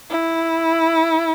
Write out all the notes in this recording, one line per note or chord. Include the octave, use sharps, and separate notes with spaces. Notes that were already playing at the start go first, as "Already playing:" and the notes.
E4